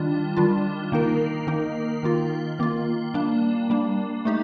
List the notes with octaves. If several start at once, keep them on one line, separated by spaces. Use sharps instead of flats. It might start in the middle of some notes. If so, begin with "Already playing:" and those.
Already playing: D#3 G3 D4 F4
D#3 G3 D4 F4
D#3 A#3 D#4 A#4
D#3 A#3 D#4 A#4
D#3 A#3 F4
D#3 A#3 F4
G3 A#3 D4
G3 A#3 D4
A3 D#4 G4